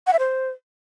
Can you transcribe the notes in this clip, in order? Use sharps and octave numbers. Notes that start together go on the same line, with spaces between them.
F#5
E5
C5